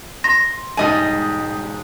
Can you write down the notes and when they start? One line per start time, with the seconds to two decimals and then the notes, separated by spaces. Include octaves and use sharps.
0.24 C6 A#6
0.77 E1 G#2 G3 D#5 G#5 D#6